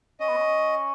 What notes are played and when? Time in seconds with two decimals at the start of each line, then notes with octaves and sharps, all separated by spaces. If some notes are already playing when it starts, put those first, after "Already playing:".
0.20 C#4 D#5
0.29 B3
0.36 C#4